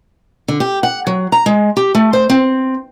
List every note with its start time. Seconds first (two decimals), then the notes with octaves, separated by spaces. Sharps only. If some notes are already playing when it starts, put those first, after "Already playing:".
0.48 D3
0.60 G4
0.83 F#5
1.07 F#3
1.32 A#5
1.46 G#3
1.77 G4
1.95 A3
2.13 C5
2.30 C4